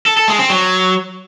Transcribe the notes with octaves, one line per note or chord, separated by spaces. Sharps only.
A4
A4
G#3
C4
F#3